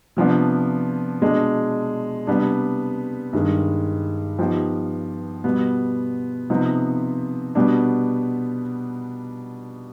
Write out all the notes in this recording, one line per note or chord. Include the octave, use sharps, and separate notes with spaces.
C3 F3 B3 D4
B2 G#3 D4
C3 G3 B3 D4
G2 D#3 G#3
F3 B3 D#4 G4
B2 G3 B3
C3 F3 B3 D#4
B2 G3 B3 D4